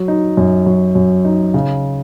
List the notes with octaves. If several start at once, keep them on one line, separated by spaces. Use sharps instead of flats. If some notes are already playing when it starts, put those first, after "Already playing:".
Already playing: F#3
D#4
F#2
F#3
F#2
D#4
C#3